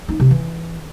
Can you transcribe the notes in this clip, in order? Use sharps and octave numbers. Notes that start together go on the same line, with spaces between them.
D#4
C3
E3